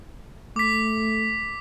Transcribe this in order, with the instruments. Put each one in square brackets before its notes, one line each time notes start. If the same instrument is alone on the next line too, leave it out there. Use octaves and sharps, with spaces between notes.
[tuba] A3 [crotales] D6 B6